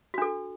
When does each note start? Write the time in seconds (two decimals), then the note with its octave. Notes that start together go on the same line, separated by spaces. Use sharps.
0.14 F#4
0.18 D4
0.22 A4